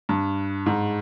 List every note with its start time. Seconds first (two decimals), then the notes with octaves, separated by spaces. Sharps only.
0.09 G2
0.66 G#2